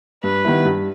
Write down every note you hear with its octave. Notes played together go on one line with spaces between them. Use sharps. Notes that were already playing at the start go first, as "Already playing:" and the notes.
G2 B4
D#3 G3 B3 E4
G2